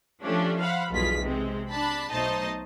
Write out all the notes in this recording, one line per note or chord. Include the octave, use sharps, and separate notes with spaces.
F3 A3 C#4 D4 G4
C5 F5 F#5 B5
B1 E2 G2 F4 G#4 B6
C3 G#3 C4
D4 A5 B5
B1 A3 D#4 C5 D#5 A5